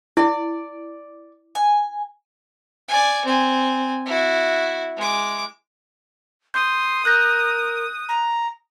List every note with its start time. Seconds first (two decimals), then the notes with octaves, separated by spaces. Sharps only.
0.17 E4 D5
1.55 G#5
2.88 D5 G#5
3.25 C4 G#5
4.06 E4 F#4
4.96 G#3 D6
6.54 C6 D#6 G6
7.05 A#4 F#6 G6 A#6
8.09 A#5